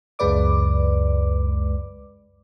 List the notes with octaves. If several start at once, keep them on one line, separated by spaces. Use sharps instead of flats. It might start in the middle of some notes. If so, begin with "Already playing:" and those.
C#2 F#2 G#3 B4 D5 D6